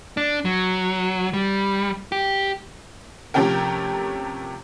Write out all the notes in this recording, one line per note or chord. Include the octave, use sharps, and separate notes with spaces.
D4
F#3
G3
G4
C3 F3 A3 C#4 G4 A#4